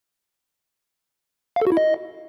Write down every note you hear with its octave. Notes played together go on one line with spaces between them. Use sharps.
F5
A4
F#4
E4
D#5